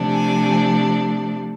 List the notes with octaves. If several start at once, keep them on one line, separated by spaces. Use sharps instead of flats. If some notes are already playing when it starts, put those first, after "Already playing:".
Already playing: C3 F3 A3 D4
G#5